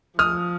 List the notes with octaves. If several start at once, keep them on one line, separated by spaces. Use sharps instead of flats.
F3 D#6 F6